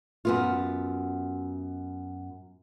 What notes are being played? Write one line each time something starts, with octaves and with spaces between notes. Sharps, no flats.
F#2 B3 F4